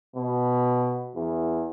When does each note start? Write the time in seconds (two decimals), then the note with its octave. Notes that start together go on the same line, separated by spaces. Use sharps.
0.16 B2
1.15 E2